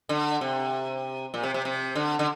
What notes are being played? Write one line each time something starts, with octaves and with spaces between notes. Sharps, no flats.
D3
C3
A#2
C3
C3
C3
D3
D3